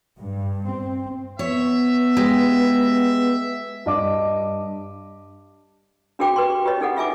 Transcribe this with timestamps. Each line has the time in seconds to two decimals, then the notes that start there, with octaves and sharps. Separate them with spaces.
0.19 G2
0.69 C4
1.39 B3 C#5 E5
2.17 G#3 G4
3.86 G2 D#5 D6
6.19 D4 F#4 G#4 C5 G5 D6
6.36 G4 B4 C6
6.65 F4 G4 B4 C#5 D#5
6.81 D#4 G#4 A4 F#5
6.97 F4 E5 G#5 D6